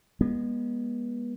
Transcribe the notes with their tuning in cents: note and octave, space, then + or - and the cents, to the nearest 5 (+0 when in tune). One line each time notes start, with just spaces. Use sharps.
G#3 -20 B3 -35